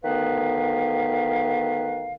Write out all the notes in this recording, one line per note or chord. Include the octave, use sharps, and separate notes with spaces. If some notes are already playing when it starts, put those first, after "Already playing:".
D2 D#3 B3 B4 F5